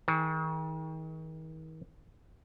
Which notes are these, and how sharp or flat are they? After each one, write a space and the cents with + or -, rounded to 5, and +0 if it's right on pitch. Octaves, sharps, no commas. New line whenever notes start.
D#3 +40 G#4 +25